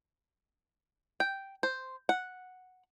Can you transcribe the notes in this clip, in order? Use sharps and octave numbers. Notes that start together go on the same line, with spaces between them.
G5
C5
F#5